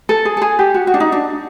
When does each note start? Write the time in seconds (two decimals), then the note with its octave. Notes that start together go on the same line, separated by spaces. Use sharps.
0.09 A4
0.25 G#4
0.37 A4
0.42 G#4
0.59 G4
0.74 F#4
0.87 F#4
0.94 D4
1.00 D#4
1.12 D4